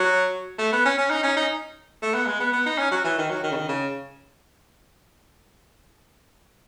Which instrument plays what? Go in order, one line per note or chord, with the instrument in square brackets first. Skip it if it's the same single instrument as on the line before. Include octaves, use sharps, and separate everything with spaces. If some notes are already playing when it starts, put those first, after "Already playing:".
Already playing: [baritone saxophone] F#3
A3
B3
C#4
C#4
D#4
C#4
D#4
A3
B3
G#3
B3
B3
D#4
C#4
F#3
E3
D#3
F#3
D#3
C#3
D#3
C#3